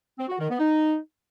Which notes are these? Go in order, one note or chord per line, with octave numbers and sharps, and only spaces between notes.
C4
F#4
D#3
B3
D#4